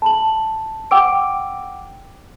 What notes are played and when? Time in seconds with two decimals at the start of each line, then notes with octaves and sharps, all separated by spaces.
0.02 A5 B5 F#7
0.91 F#5 G5 D6 E6 D7